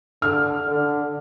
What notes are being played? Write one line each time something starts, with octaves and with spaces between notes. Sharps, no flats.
D3 F6
D3